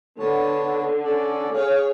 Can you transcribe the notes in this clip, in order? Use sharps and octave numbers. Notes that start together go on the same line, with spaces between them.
D3 B3 C#5 A5
C#4 A4 D5
G#4 C#5 F5